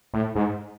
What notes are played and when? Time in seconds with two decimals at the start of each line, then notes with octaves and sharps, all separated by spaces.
0.14 A2
0.35 G#2